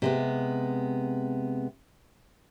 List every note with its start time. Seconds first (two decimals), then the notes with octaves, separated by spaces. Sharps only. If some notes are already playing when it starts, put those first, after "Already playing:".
0.02 C3 G#3 B3